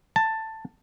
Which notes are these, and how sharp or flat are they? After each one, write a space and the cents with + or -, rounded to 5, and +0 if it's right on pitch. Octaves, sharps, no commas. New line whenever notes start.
A5 +10